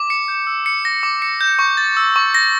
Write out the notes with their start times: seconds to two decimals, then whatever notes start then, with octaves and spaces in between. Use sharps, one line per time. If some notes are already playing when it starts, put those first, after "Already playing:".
Already playing: D6
0.10 C#7
0.28 G6
0.47 E6
0.66 C#7
0.85 A#6
1.03 D6
1.22 C#7
1.41 G6
1.59 C#6
1.77 A6
1.97 E6
2.16 C#6
2.35 A#6